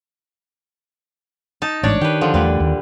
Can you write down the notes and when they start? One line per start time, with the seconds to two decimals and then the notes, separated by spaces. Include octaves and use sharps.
1.62 D#4 A5
1.83 A1 G#2 D4 C#5 D5
2.01 D#3 G4 B4
2.21 D3 F3
2.34 E2 A#2 G3 A3 B4
2.60 D#2